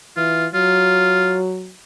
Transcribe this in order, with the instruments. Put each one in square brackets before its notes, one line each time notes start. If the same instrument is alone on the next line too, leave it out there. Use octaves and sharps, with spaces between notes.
[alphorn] E3 [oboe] F4
[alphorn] F#3 [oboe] F4